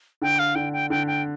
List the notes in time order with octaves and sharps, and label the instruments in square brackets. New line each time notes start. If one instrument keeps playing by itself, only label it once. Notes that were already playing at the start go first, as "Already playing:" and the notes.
[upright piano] D3 [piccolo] G5
[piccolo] F5
[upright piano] D3 [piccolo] G5
[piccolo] G5
[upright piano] D3 [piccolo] G5
[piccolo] G5